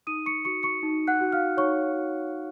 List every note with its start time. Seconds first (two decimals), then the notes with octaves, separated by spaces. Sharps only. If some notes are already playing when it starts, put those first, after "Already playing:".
0.07 D#4 D#6 D#7
0.26 C#6 C#7
0.45 F#4 C#6 C#7
0.63 C#6 C#7
0.83 D#4
1.07 F#5 F#6
1.21 F#4
1.32 F5 F6
1.57 D#4 C#5 C#6
1.96 F#4
2.33 C#5